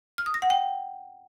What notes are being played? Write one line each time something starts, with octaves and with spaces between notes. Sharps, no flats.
F6
D#6
A#6
F#5
G5